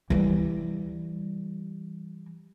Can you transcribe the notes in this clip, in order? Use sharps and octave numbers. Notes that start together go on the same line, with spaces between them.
E3 G3